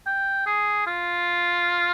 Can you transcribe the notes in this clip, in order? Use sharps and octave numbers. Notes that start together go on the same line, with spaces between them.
G5
G#4
F4